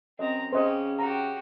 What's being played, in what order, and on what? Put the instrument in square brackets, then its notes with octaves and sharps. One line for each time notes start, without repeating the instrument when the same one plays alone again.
[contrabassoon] F#2 [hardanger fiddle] C4 A#5 [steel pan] D#5
[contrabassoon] C#3 [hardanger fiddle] C#4 G4 [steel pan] C5 D#5
[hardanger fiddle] F#4 G4 [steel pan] A#5